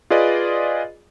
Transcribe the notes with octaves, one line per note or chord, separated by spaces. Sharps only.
F4 G#4 B4 D5 D#5